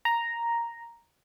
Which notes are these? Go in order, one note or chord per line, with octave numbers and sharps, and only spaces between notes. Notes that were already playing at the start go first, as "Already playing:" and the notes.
A#5